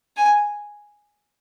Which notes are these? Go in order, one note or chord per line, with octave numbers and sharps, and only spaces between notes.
G#5